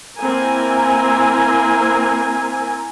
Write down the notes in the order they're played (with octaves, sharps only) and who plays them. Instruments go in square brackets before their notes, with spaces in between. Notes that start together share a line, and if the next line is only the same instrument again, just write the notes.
[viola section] A#3 C4 E4 A#4 G#5